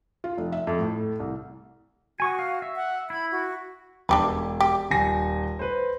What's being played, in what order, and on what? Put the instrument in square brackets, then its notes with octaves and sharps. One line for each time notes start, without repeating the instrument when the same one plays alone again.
[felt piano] F4
F1
E5
F2
A2
C2
[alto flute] F#4 [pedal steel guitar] G#5 C#6 D#6
[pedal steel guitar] F5
E5
[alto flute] F#5
[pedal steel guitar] E4 [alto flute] B5
[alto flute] F#4
[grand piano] E1 [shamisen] D4 G4 B4
[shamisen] G4
[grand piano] D#1 G#5 A#6
B4 C5